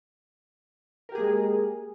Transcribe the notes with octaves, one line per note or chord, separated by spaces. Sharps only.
G#3 A#3 G4 G#4 A#4